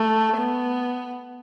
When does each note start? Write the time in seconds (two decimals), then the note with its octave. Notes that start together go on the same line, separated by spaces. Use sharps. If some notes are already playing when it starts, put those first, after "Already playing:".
Already playing: A3
0.37 B3